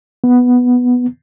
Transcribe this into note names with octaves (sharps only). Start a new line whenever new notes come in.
B3